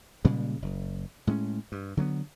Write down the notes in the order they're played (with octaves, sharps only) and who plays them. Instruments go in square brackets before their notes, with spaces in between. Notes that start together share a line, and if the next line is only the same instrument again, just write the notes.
[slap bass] A#2 C#3 G3 G#3
F#1
A2 G#3 A#3 C#4
G2
D3 F#3 A#3 B3